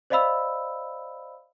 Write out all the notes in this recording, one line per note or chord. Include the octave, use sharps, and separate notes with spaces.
C5 D5 D#5 F5 B5 E6